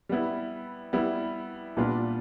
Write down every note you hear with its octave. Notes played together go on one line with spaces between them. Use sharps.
G3 B3 E4
G3 B3 E4
A#2 G3 B3 D4 F4